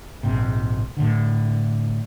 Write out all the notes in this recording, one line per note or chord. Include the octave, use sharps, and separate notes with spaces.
A#1 G#2 C3
A2 D3